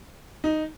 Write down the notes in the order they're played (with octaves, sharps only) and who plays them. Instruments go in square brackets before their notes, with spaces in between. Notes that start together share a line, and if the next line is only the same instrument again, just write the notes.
[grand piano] D#4